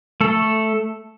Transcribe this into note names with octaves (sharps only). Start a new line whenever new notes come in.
A3 A4